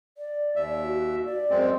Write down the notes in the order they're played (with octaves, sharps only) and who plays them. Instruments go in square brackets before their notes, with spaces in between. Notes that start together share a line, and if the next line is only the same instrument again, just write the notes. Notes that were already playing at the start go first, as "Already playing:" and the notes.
[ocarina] D5
[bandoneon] D#2 E5
[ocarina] F#4
D5
[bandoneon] F#2 G#3 C4